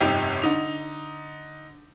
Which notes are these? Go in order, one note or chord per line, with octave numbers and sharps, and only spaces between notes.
G1 F2 C3 D#4 G5 F7
D3 D#4 F7